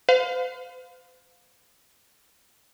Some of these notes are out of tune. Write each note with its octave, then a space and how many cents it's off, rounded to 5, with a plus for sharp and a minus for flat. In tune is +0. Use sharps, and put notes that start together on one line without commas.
C5 -45 F5 +25